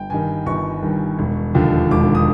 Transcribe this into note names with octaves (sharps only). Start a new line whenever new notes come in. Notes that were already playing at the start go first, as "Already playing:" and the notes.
Already playing: G1 G5
G2 D#3 G#5
G1 C#6
G2 D#3
E1
D#2 D3 F3
E1 D6
D#6